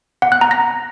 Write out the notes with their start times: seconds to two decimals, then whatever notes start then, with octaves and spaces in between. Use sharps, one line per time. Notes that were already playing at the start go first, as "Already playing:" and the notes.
0.22 F#5
0.32 F#6
0.41 A#5
0.51 A#6